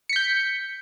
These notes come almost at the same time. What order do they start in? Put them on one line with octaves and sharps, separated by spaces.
C#7 B6 G6